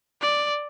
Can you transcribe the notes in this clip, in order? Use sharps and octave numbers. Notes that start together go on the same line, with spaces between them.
D5